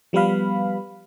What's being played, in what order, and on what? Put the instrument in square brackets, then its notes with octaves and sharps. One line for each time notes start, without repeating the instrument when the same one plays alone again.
[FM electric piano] F3 G3 B3 B4 F5 B5